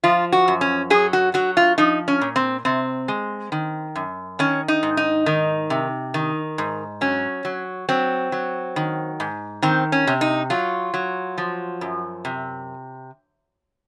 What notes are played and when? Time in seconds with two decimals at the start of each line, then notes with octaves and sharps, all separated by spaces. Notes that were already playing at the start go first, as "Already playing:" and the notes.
0.04 F3 F4
0.32 F#4
0.48 F#2
0.61 C#4
0.90 F#3 G#4
1.13 F#4
1.34 F#3 F#4
1.57 F4
1.78 F3 D#4
2.08 C#4
2.22 A#2
2.36 C4
2.65 C3 C4
3.08 G#3
3.52 D#3
3.96 F#2
4.39 D#3 C#4
4.68 D#4
4.83 G#2
4.97 D#4
5.26 D#3
5.70 C3
6.14 D#3
6.58 G#2
7.01 F#3 C#4
7.45 F#3
7.89 F#3 C4
8.32 F#3
8.76 D#3
9.20 G#2
9.62 D#3 C4
9.92 C#4
10.07 C3
10.21 D#4
10.50 F#3 F4
10.94 F#3
11.38 F3
11.81 F#2
12.25 C3